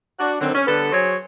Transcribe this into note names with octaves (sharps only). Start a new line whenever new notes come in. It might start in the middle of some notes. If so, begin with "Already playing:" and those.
D4 F#4
D3 D#3 F#3 C4
C#4
D3 G3 B3 A4 B4
F#3 G#4 C5 C#5